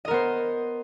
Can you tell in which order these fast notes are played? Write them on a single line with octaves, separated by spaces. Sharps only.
D#5 A#4 B3 C5